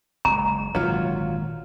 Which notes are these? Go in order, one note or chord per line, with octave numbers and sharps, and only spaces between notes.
F#1 A2 G#3 A#5
G#1 A#2 D3 F#3 F4